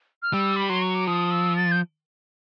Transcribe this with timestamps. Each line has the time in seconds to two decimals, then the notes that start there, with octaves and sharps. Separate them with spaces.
0.22 F6
0.33 G3 E6
0.56 B5
0.69 F#3 C6
0.82 C#6
0.95 D6
1.07 F3 D#6
1.31 E6
1.56 A6
1.72 G6